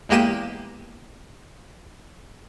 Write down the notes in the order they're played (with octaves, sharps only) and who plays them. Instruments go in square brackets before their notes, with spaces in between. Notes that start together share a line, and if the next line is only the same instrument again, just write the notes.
[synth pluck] E2 G#3 A#3 G4 D#7 E7